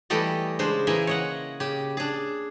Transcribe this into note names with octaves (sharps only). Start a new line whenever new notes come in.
E3 G3 A3 G4 A4 D#5
C#3 G#3 D4 C5
E3 A#3 D#5 E5 G#5
C#5 D#5 F#5
C#3 G4
D4 G#4